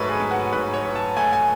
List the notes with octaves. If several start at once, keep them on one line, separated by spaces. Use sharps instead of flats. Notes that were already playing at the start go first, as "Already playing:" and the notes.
Already playing: G#2 F#3 A3 B4 C#5
G#4
G#2
F#4
G#2 B4
C#5
F#3
A5
A3 G#5
G#5